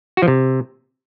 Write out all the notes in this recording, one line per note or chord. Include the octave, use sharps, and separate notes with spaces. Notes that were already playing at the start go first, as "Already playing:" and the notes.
F#4
F3
C3